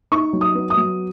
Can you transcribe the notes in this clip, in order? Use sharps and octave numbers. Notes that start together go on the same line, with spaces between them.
D#4 C#6
F#3
D#6
B3
D#6
F#3